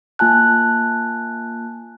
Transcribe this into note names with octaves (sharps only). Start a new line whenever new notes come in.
A#3 F4 G#5 A5 F#6